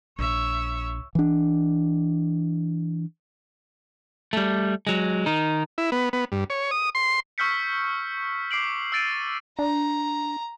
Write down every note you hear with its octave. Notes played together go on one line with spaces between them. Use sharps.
A#1 C#5 E5
E3 D4
G3 A3
F#3 G#3
D#3 D#4
E4
B3
B3
G2
C#5
D#6
C6
C#6 E6 F6 G6 B6 C#7
D6 C7 D7 F#7
E6 F6 A6 D7 D#7
D4 A#5